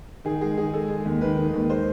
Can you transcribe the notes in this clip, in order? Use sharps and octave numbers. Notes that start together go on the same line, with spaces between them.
D#3 G#4
G#3 G#4
D#3 G#4
G#3 A4
G#3
D#2
D#3 B4
D#3
D#2
G#3 C5